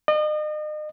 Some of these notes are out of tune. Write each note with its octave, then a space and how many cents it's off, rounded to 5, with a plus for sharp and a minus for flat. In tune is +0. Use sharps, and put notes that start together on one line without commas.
D#5 -40